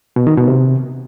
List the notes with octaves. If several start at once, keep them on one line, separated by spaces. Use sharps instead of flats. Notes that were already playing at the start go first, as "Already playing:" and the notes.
B2
D#3
B2
C3